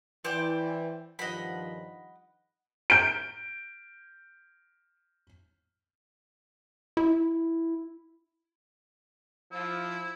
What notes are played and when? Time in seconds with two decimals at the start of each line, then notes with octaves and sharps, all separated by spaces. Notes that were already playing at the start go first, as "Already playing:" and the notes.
0.25 E3 C5 D5 G5
1.19 G2 D#3 F3 D#5 F#5 B5
2.90 G6 D7
6.97 E4
9.51 F3 E4